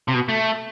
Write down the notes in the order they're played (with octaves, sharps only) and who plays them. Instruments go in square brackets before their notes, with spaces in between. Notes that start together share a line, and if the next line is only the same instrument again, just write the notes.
[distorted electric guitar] C3
B2
A3